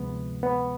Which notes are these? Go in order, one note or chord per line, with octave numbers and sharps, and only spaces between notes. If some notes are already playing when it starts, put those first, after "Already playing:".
Already playing: D2 C3 F3 G#3 B3
B3